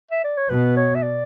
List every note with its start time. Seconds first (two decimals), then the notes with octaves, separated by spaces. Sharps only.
0.11 E5
0.24 D5
0.37 C#5
0.50 B2 B4
0.77 C#5
0.95 E5
1.03 D5